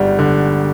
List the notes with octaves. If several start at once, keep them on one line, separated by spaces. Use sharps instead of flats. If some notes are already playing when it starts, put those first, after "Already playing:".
Already playing: G1 G3 F#5
D3